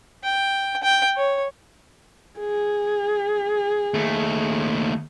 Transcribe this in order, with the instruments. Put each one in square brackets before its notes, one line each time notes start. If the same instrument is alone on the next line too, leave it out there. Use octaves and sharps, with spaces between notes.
[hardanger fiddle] G5
G5
C#5
[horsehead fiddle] G#4
[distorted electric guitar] D#2 A3